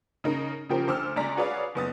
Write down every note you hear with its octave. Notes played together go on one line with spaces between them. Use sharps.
C#3 D#4 A#4
C#3 F3 G4 A#4 C5
D2 C5 D6 E6 F6
C#2 G#3 D5 A#5 B6
F#4 G#4 B4 C#5 D5 F5
F#1 B3 D#6 A6